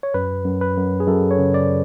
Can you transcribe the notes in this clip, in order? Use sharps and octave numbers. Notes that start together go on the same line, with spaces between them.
C#5
F#2 B4
F#2
B4
F#2
G#4
F#2 A4
C#5
C#3
D5